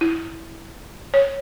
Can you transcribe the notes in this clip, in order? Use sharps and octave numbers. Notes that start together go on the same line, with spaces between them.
E4
C#5